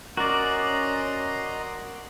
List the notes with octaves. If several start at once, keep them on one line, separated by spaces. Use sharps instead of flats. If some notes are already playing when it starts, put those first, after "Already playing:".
C#4 F#4 A#4 D5 D#5 A#5 C6